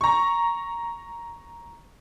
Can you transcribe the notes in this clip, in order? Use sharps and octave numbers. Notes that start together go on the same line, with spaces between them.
A#5 C#6